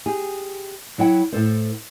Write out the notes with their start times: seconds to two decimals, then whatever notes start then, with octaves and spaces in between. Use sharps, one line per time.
0.06 G4 G#4
0.98 F#3 E4 F#5 G5
1.33 A2 A4 C5